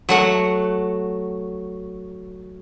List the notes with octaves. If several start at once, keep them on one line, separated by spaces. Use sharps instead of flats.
F#3 A3 F#5